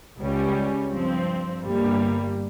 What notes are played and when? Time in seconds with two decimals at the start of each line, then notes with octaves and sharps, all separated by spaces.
0.19 C#2 C#3 G3 C#4
0.93 G2 F3 C4
1.66 G1 G2 G3 A#3